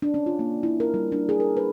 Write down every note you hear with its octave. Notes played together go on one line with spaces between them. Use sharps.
D4
C#4
F4
A#3
E4
A#4
G3
D4
G#4
A#4
B4